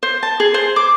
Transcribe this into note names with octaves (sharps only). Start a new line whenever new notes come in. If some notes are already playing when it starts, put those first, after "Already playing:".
C5
A5
G#4
C5
D6